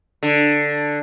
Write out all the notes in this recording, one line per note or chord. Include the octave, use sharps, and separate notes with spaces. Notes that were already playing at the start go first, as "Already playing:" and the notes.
D3